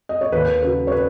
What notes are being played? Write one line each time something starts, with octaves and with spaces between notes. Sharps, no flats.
D#5
C#5
D#2 B4
C#3 F#3 B4
C#5
B4